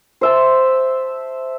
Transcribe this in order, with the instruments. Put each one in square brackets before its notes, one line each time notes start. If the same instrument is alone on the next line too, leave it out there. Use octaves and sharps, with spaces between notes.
[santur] C5 E5 A5